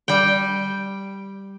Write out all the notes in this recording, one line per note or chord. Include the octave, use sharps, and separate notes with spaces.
G3 G5